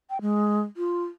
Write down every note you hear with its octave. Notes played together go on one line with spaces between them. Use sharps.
G5
G#3
F4